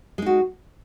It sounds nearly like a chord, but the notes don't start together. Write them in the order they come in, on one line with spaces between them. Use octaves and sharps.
G#3 D#4 F#4